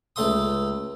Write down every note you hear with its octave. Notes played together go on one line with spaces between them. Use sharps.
C#2 A3 A4 E5 C6 D#6